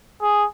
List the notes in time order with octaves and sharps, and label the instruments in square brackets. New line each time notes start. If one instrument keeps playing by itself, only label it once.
[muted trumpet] G#4